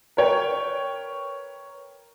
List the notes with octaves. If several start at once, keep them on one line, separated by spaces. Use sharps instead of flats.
A#4 B4 C#5 G5